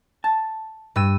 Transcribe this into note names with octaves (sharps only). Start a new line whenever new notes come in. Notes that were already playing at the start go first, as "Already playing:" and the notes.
A5
G2 E6 D#7